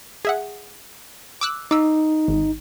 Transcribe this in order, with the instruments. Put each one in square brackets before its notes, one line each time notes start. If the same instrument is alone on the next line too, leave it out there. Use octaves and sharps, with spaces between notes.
[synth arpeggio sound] G#4 E5 F#5
D6 E6 F#6
[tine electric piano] D#4 [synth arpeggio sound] D6 E6
[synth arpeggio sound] G#1